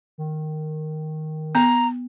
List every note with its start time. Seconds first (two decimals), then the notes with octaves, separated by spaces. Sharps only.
0.18 D#3
1.55 B3 A#5